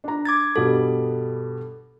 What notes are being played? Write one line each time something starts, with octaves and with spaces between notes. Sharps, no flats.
D4 A#5
D6 G#6 A6
G2 B2 G3 A4